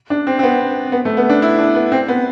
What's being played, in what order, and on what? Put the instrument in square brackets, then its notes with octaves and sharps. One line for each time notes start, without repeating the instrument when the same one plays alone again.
[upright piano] D4
C4
C4
B3
B3
A3
B3
D4
E4
D4
B3
C4
B3